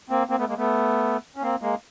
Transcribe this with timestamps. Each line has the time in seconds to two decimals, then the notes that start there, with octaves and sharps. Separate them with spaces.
0.10 A#3 C4
0.29 A#3 C4
0.38 A3 B3
0.48 G#3 A#3
0.57 A3 B3
1.36 C#4
1.42 A#3 C4
1.61 G#3 A#3